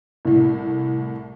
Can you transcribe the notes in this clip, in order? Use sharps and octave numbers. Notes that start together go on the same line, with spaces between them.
C2 A2